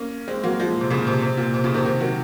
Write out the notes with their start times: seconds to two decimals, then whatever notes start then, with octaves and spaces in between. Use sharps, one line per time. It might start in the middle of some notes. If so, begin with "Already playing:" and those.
Already playing: A#3 C#4
0.28 G#3 C4
0.44 F#3 A#3
0.60 F3 G#3
0.70 A#2
0.80 C3
0.90 A#2 C#3
1.07 C3
1.22 C3
1.37 A#2
1.54 C3
1.64 A#2 C#3
1.74 C3 D#3
1.85 C3 D#3
2.01 D#3 F#3